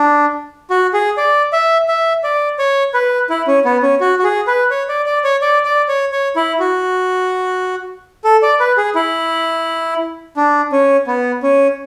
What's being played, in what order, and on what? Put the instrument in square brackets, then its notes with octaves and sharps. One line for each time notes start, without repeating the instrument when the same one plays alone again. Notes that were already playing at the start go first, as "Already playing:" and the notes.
Already playing: [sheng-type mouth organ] D4
F#4
G#4
D5
E5
E5
D5
C#5
B4
E4
C#4
B3
C#4
F#4
F#4
G#4
B4
C#5
D5
D5
C#5
D5
D5
C#5
C#5
E4
F#4
A4
D5
B4
G#4
E4
D4
C#4
B3
C#4